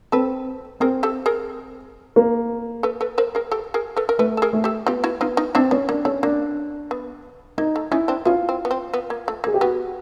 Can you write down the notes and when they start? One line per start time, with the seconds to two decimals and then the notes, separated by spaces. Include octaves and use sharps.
0.12 C4 A4 B4
0.80 C4 G#4 A#4
1.03 G4 A4
1.26 G#4 A#4
2.16 A#3
2.83 A4 B4
3.01 A4 B4
3.18 A#4 C5
3.35 G#4 A#4
3.51 G4 A4
3.74 G#4 A#4
3.97 A4 B4
4.09 A#4
4.19 A3 A4 B4
4.37 A4
4.42 G#4 A#4
4.53 A3
4.64 G4 A4
4.86 B3 F4 G4
5.04 E4 F#4
5.21 B3 D#4 F4
5.37 D#4 F4
5.55 C4 D4 E4
5.71 B3 C#4
5.89 A#3 D4
6.05 A3 C#4
6.23 A#3 D4
6.91 B3
7.58 A#3 D#4
7.76 A3
7.91 C#4 D#4 E4
8.08 C4 D4
8.25 B3 C#4 F4
8.49 C4
8.65 B3
8.71 C4
8.94 B3
9.10 A#3
9.28 A3
9.44 A#3
9.47 G#4
9.54 G4
9.61 B3 F#4